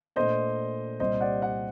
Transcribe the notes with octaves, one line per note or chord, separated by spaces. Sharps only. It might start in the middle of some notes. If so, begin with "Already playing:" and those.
A#2 A3 D4 C5 D#5
C2 A#2 G3 C5 D#5
D5 F#5
D5 F#5